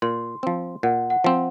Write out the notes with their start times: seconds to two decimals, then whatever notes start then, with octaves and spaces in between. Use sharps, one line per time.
0.02 A#2 C6
0.43 F3 C4
0.83 A#2 F#5
1.10 F#5
1.24 F3 C4